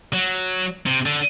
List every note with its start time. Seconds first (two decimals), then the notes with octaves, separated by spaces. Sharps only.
0.13 F#3
0.86 C3
1.06 D3